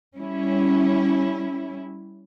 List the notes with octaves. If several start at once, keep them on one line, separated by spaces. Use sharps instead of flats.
G3 C#4 E4